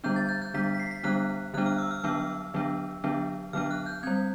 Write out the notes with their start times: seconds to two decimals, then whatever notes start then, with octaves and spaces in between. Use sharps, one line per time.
0.04 D3 G3 B3 D4 G6
0.16 A6
0.29 G6
0.42 G6
0.54 D3 G3 B3 D4 B6
0.75 B6
0.80 C7
0.91 B6
1.04 D3 G3 B3 D4 F#6
1.54 D3 G3 B3 D4 F#6
1.66 F6
1.78 E6
1.91 F6
2.04 D3 F#3 B3 D4 E6
2.54 D3 F#3 B3 D4
3.04 D3 F#3 B3 D4
3.53 D3 F#3 B3 D4 F6
3.71 F#6
3.86 G6
4.03 G3 C4 G#6